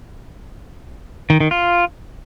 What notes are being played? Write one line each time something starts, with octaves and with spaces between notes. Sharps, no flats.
D#3
D#3
F4